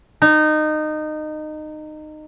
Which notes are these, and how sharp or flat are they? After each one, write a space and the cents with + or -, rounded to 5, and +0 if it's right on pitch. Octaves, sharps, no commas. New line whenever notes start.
D#4 -20